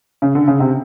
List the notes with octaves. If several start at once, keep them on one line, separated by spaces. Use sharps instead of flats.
C#3
D3
C#3
C3